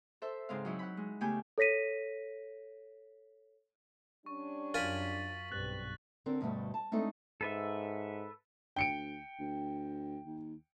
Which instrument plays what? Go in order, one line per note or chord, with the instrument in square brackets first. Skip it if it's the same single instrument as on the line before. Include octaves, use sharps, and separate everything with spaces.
[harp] A4 C5 E5
G#2 C#3 C4 F5
F#3 D#4 E4
F#5 B5
G#3
C#3 A3 B3 G4 G#5 G6
[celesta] A4 C#5 A#6 B6 D#7
[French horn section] G3 C#4 D4 [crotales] C#6
[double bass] F#2 [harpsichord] F4 A#4 G#5 [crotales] A6 B6 F#7
[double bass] B1 G2 [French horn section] C4 G4 B4 [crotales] F#6 A6 F#7
[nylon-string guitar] D3 C4 D4 A#4
D2 G2 B2 G3 A3
A5
G#3 A3 C4 D4 D#4 A4
[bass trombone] G#2 [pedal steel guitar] A4 B4 E5
[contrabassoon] D2 [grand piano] G5 C#7 D7
[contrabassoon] D2
D#2